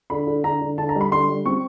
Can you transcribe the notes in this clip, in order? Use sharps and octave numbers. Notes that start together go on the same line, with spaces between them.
D3 B5
D3
D3 A#5
D3
D3 A5
A#5
G3
B5
D3 C6
G3
C4 C#6